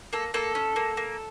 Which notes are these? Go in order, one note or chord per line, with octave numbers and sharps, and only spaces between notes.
A#3 A4
A#3 A4
C#4
A#3
A#3